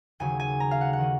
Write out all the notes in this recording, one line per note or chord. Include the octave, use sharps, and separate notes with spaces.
D#2 C#3 F#3 G#5
G#5
A#5
F5
F#5
F#5
D#3 A#3 C#4